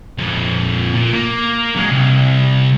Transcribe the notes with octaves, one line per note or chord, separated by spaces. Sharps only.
F2 A#2
A#2
A#3
F#3 G#3
C2